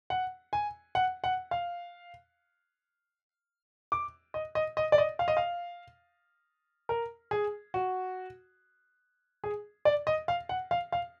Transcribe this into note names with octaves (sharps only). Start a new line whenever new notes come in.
F#5
G#5
F#5
F#5
F5
D6
D#5
D#5
D#5
D5
D#5
F5
D#5
F5
A#4
G#4
F#4
G#4
D5
D#5
F5
F#5
F5
F5